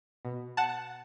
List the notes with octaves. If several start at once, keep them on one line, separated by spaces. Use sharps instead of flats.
B2
F#5 A5